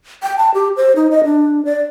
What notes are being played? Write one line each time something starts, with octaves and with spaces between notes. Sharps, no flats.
G5
A5
G4
C5
D#4
D#5
D4
D5